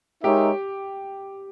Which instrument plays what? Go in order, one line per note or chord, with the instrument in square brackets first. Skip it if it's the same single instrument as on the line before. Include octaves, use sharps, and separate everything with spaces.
[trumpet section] G#3 D#4 A#4 C#5 E5 [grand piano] G4